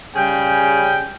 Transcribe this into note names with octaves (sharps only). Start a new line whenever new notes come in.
C#3 G3 C#4 G#4 G5